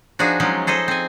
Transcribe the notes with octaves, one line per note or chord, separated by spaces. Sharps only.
F3 D4 D#4 F#4 G#4
F3 F#3 G#3 C#4 D#4 F4
G#4 A4 C5 D#5
C4 G#5